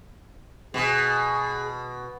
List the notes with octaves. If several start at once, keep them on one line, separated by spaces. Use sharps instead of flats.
B2 G#4